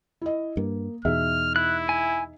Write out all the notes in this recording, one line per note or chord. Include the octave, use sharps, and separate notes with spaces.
E4 D#5
G2 A#3
E2 B2 D#4 G#4 E5 F6
E4 F#6
G#5